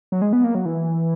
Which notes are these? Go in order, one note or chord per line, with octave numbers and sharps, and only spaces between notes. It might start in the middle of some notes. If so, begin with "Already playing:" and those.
F#3
G#3
B3
A#3
F#3
E3